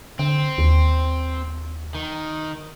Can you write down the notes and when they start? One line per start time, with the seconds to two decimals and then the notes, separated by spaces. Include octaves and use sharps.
0.19 D3 C4
0.58 D#2
1.95 D#3